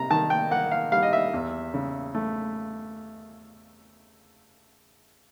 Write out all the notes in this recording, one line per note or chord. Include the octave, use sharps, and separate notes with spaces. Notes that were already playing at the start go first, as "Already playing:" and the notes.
Already playing: C3 A#5
D#3 A5
G5
A#3 F#5
F5
G3 F5
D#5
E5
E2
C#3
A3